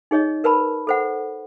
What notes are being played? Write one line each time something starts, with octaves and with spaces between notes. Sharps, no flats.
D#4 G#4 C#5 D#5
A#4 B4 A5 B5
A4 C5 F#5